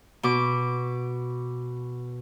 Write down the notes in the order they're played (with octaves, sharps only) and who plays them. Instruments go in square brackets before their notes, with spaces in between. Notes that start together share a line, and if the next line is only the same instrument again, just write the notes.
[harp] B2 D6